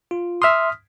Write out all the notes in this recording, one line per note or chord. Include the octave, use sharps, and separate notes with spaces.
F4
E5 C6 D#6 F6 B6